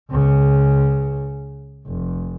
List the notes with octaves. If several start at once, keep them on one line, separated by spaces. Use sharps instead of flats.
C#2 C#3
F1